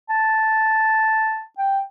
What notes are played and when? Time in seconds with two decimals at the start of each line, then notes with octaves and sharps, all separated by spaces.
0.10 A5
1.58 G5